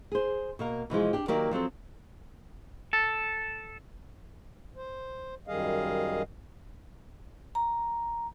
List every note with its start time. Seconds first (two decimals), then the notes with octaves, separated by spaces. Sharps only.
0.12 G#4 C5
0.59 B2 A#3 A#4
0.90 B2 E3 F3 G#3
1.13 D4 G4
1.28 D#3 F#3 A#3 G4 A#4 D5
1.51 F3 F#3 C4 A4
2.93 A4
4.76 C5
5.48 F#2 D#3 G3 G#4 D#5 F5
7.55 A#5